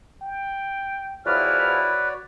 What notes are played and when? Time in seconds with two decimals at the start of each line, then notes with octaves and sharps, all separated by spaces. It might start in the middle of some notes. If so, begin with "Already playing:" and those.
0.22 G5
1.26 E2 F3 E4 F#4 B4 C#5 D5 F6